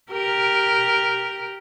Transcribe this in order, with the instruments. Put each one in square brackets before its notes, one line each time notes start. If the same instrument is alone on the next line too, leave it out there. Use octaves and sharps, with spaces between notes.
[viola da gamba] G4 A#4